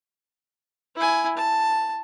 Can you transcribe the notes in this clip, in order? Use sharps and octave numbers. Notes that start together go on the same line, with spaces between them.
E4 G#5
A5